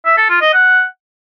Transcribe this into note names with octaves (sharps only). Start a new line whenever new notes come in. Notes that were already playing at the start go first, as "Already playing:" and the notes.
E5
A4
F4
D#5
F#5